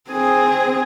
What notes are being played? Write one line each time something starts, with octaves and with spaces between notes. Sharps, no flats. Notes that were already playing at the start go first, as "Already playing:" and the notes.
C4 G#4